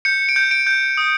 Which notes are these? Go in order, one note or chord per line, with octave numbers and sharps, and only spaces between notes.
G6 C#7
D7
G6
D7
G6
D#6